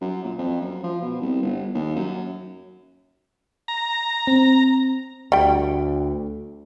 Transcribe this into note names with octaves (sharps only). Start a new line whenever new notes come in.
F#2
A#2
F2
F#2
F3
B2
C2
G1
D#2
F#2
A#5
C4
D2 G3 G5